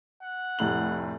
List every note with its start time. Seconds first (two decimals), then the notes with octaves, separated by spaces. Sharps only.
0.23 F#5
0.59 F1 A2 F#7